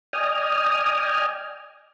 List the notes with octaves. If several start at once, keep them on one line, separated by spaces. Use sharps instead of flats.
D5 D#5 G5 G#5 D#6 F6